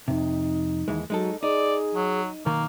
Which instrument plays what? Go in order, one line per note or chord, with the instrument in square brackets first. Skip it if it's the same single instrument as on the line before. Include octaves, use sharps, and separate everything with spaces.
[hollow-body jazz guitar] F2 C3 [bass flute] D#4
[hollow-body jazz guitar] D#2 E3 G#3
[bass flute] F#3 [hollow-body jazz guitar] G#3 D#4 A4
[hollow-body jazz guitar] D#4 [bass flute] G#4 [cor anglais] D5
[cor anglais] F#3
[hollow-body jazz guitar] B1 D#3 [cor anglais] A#3